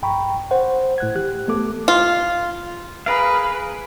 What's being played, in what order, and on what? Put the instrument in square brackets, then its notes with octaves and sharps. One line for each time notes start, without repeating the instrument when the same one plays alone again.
[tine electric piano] A#1 G2 G5 A#5 B5 C#6
G1 C5 F#5
A2 F#6 G#6
E3 G4 F#6
G1 A3 B3 A4 D6
[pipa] F4
[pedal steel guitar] G#4 A#4 F5 [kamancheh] B4